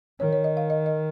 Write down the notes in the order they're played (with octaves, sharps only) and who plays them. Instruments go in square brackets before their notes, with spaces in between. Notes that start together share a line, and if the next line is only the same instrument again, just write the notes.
[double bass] D#3 [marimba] C#5
[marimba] C#5
D#5
F5
D#5
D#5